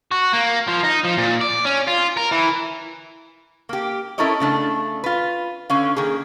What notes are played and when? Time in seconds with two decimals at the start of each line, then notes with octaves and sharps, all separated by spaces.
0.11 F#4
0.33 A#3
0.67 F3
0.83 D#4
1.04 F3
1.18 A#2
1.41 D5
1.65 C#4
1.88 F4
2.17 A#4
2.32 E3
3.69 A#3 G4
4.18 C#4 E4 A4 A#4 C#5 D#5
4.40 C#3 A3 D4
5.04 F4 B4
5.70 D3 C#4 F5
5.97 D#3 A#3 G#4